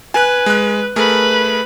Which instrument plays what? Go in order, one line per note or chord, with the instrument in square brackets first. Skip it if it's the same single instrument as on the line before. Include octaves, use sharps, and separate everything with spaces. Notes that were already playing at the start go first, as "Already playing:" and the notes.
[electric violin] B4 [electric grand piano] G#5 F#6
[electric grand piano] G#3 F#6
[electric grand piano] A3 G#4 A#4 [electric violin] B4 B5